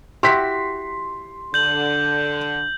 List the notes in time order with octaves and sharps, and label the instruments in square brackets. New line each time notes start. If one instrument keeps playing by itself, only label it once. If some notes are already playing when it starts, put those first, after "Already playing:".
[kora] E4 F#4 G4 [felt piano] C6 B6
[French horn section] D3 [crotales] G6 F#7